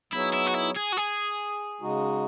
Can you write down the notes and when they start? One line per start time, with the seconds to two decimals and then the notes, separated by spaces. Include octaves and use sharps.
0.13 F#3 B3 D#4 E4 G#4 C#5
0.33 E4
0.46 F#4
0.54 E4
0.76 G#4
0.92 F#4
0.97 G#4
1.81 C#3 G#3 D#4 F#4